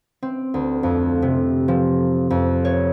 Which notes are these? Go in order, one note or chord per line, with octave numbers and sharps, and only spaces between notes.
C4
D2
F2
C3
F3
F2
C#5